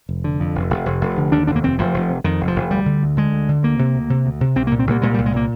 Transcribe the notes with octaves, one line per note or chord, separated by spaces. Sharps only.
F1
D3
F2
F1
F1
F1
F1
D3
D#2 D4
F1 D4
A#3
F1 C4
F1 F3
F1
C3
F2 D#3
F1
F3
F1
D2 G3
D3
D2
D3 G#3
D2
D3
D2 A#3
C3
D2
C3
D2
C3
C2 C4
A#3
A#2
C4
C2 A#3
A#2 G#3
G3
C2
G#3
A#2 A#3